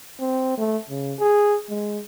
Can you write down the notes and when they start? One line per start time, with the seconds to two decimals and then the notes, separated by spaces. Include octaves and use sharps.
0.20 C4
0.58 A3
0.90 C#3
1.19 G#4
1.70 G#3